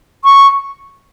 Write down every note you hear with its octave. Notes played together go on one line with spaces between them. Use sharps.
C#6